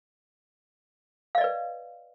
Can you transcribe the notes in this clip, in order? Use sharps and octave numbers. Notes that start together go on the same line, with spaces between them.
B4 D5 D#5 F5